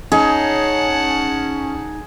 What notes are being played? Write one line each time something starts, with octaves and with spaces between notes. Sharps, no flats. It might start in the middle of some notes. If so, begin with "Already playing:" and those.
C#4 D#4 G#4 F#5 A5